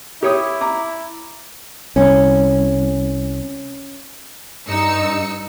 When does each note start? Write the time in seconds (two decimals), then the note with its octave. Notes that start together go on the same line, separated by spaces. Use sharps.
0.23 E4 G4 C#5 D#6
0.61 A#5 D6
1.96 C2 C#4
4.68 G2 D#4 E6 C#7